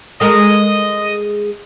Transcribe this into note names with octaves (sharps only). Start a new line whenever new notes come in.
G#3 A4 A#4 D#5